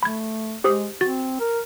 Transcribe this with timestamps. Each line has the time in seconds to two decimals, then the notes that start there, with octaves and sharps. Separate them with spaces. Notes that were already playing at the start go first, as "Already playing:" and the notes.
0.03 A3 B5 G#6
0.64 G#3 G4 C5 D#6
1.01 C4 F#4 A6
1.40 A#4